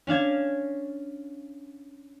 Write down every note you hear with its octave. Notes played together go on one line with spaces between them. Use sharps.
C#4 D4 F5 G#6